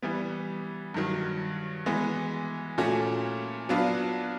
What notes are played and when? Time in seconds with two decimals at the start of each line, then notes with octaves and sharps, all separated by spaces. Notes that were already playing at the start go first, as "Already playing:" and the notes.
0.02 E3 G3 B3
0.94 G2 D#3 F#3
1.86 E3 G#3 B3
2.78 A#2 F3 A3 C#4 F#4
3.69 F#3 B3 D4 F4